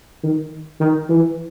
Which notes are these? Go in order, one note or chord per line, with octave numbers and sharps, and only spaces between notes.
D#3
D#3
E3